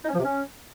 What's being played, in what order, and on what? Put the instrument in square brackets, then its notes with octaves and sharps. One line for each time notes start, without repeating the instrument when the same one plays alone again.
[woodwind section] D#4
C#4
F3
C3
C#4